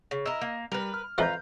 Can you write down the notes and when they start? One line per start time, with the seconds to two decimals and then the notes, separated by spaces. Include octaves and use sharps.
0.11 C#3
0.26 E4 A#4 D#5 E6
0.41 A#3
0.72 G3 A#4 B4
0.94 F6
1.18 F2 E3 F3 F4 B4 A#5 G6